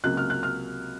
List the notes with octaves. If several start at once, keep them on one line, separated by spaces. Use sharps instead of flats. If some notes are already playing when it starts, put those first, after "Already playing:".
C#2 C3 F#3 A#3 F#6
F6
F#6
F6